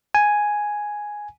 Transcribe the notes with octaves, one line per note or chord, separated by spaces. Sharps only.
G#5